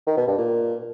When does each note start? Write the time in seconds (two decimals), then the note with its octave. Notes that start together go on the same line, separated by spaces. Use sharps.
0.07 D#3
0.17 B2
0.27 G2
0.38 A#2